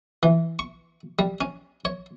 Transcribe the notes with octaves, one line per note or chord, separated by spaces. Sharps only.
E3
C#6
G3
C#4
C#5